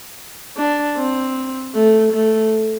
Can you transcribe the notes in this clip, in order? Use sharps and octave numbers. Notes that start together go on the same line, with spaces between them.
D4
C4
A3
A3